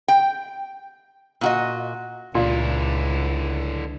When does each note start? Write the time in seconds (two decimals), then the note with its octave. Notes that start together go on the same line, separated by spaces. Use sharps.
0.08 G5
1.41 A#2 F#4 D#5
2.35 C#2 A#2 D3 E4